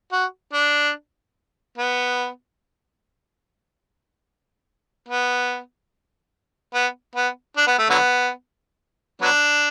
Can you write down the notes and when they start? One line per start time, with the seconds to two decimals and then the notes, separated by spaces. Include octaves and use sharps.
0.12 F#4
0.53 D4
1.78 B3
5.08 B3
6.74 B3
7.15 B3
7.57 D4
7.67 B3
7.78 A3
7.90 D3 F#3 B3
9.22 F#3 B3 D4